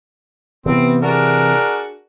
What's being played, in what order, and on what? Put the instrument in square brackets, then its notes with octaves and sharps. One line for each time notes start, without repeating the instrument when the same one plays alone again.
[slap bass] C3 E3 [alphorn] B3 [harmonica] C4
[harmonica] D4 F#4 A#4 [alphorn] G#4